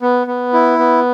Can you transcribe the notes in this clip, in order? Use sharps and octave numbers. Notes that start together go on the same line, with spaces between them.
B3
B3
E4
B3